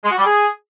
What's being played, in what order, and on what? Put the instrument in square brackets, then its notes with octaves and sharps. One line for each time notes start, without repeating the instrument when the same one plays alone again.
[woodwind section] G#3
F#4
G3
G#4